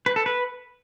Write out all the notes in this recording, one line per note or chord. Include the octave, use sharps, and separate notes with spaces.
B4
A4
B4